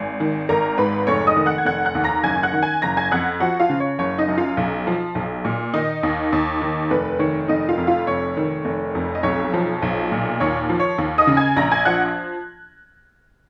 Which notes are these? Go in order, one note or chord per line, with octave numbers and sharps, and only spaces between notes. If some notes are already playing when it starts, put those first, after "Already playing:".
Already playing: G#1 G#5
D#3
G#1 A#4 A#5
G#2 B4 B5
F1 C#5 C#6
D#5 D#6
D#3
F#5 F#6
G#6
F1 F#5 F#6
F#5 F#6
D#2
A#5 A#6
F#1 G#5 G#6
F#5 F#6
D#3
G#5 G#6
F#1 A#5 A#6
G#5 G#6
F2 F#5 F#6
F3 F#4 F#5
F4 F5
C#3
C#5
F#1 C#5
D#4 D#5
F#2
F4 F5
B1
F3
B1
A#2
D#3 D#4 D#5
D#2
D#2
D#3
F1 B4
D#3 C#5
F1 D#4 D#5
F4 F5
F2
F4 F5
F1 C#5
D#3
F1
F2
D#5
B1 C#5
F3
B1
A#2
D#2 C#5
F3
C#5
D#2
D#5 D#6
C#3
G#5 G#6
A#1 A#5 A#6
G#5 G#6
F3 F#5 F#6